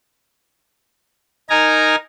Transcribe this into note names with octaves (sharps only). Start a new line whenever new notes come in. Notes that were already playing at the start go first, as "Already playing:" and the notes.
D#4 A#4 G#5 A#5